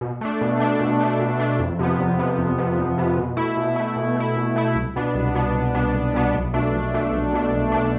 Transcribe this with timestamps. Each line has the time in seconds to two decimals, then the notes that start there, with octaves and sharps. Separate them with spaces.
0.01 B2
0.21 A3 D4
0.41 B2
0.60 A3 D4
0.80 B2
1.01 A3 D4
1.19 B2
1.40 A3 D4
1.59 F2
1.79 C3 F3 B3
1.99 F2
2.19 C3 F3 B3
2.38 F2
2.58 C3 F3 B3
2.78 F2
2.98 C3 F3 B3
3.18 B2
3.37 A3 E4
3.57 B2
3.76 A3 E4
3.96 B2
4.16 A3 E4
4.36 B2
4.56 A3 E4
4.75 C2
4.96 B2 B3 D4
5.15 C2
5.35 B2 B3 D4
5.54 C2
5.75 B2 B3 D4
5.94 C2
6.14 B2 B3 D4
6.34 B1
6.54 B2 A3 D4
6.73 B1
6.93 B2 A3 D4
7.12 B1
7.33 B2 A3 D4
7.52 B1
7.72 B2 A3 D4